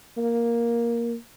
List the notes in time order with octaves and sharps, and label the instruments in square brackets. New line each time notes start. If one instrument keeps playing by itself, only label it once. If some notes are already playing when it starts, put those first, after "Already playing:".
[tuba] A#3